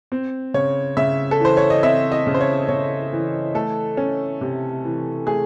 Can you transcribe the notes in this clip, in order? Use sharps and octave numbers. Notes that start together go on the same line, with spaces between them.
C4
C#3 C#5
C#3 E5
A4
E3 C5
C#5
D#5
C4 E5
D#5
C#3
C5
C#5
C#3 C#5
E3
A3 A4
C#4
C3
E3
A3 G#4